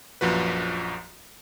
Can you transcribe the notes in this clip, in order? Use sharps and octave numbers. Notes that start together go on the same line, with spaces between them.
A#1 F#2 F3 F#4 B4